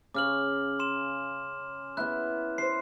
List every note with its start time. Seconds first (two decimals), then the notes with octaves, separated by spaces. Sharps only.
0.14 C#3 D6 F6 F#7
0.79 C6 E7
1.97 B3 E4 F#6
2.58 C5 C7